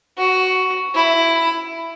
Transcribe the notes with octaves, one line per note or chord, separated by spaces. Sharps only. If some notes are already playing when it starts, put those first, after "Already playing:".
F#4
E4